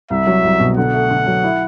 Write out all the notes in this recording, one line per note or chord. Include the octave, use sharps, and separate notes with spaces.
C2 E5
F#3
C2
B2
D3 F#5
A3
D3
F#3
E4